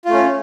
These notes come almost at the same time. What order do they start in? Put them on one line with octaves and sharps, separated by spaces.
F4 A3 C#4